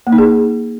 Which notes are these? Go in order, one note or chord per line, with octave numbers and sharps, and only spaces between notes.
A#3
D#4
G#4